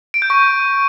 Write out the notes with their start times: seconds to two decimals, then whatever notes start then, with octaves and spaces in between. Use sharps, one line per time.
0.14 D7
0.22 G6
0.30 C#6